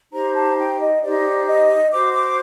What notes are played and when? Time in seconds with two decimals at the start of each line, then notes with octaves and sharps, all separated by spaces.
0.12 D#4 G4 C5 A#5
0.34 A5
0.57 G5
0.79 D#5
1.01 D#4 G4 C5 D5
1.46 D#5
1.90 F#4 C5 D6
2.13 D6